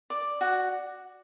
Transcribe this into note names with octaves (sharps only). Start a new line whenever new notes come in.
D5
F#4